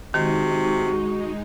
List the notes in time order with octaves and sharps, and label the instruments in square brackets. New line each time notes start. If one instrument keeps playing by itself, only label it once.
[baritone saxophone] C3 [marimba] D#3 [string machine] G#3 D#4 [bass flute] F#4